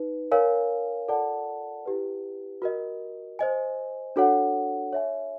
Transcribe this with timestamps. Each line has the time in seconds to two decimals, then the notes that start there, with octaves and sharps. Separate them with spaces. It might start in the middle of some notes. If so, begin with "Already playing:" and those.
Already playing: D#4 B4
0.31 A#4 C#5 F5 G#5
1.08 F4 A4 D5 F#5 A5
1.85 E4 G4 B4
2.62 F#4 A#4 D#5
3.39 C5 D#5 G#5
4.16 D4 F#4 A4 C#5 F#5
4.93 C#5 E5 G#5